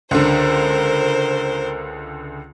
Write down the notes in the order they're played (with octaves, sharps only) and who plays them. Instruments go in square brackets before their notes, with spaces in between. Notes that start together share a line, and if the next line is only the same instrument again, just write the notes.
[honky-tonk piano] C#2 D3 [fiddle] A#4 C5